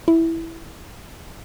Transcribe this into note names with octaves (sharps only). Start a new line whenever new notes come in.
E4